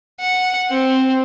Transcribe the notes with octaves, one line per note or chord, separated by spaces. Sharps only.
F#5
C4